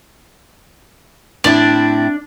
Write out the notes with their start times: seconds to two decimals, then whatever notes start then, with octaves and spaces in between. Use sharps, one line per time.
1.44 A2 C4 D4 E4